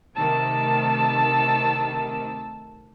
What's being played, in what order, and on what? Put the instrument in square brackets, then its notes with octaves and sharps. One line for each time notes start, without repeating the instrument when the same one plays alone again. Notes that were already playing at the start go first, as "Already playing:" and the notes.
[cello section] C3 D#3 A3 [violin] A5 E6